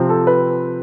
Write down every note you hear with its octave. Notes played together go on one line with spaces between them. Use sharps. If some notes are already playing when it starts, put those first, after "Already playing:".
Already playing: C3 F3 C4
A4
B4